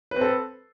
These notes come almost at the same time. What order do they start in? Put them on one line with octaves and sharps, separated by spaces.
B4 C4 A4